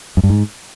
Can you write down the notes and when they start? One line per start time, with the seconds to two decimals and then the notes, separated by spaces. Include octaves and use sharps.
0.17 F#2
0.23 G2
0.30 G#2